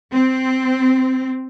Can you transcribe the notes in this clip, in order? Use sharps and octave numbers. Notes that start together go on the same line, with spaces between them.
C4